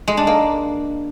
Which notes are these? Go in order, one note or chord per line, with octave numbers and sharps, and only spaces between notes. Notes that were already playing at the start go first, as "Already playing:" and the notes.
G#3
D4
A#3